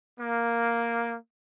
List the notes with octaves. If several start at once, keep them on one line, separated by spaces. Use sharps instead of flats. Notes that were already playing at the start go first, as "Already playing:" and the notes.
A#3